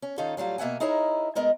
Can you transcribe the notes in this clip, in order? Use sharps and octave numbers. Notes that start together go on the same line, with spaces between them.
C#4
D#3 C#4 D#4 F4 A4
A2 F#3 G3 F4
B2 A#3 E5 F#5 G#5
D#4 E4 G#4 A#4 C#5 D#5
A2 G#3 B3 A#4 D#5